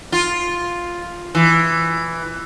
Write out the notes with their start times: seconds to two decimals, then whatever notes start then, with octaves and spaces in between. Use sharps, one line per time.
0.12 F4
1.35 E3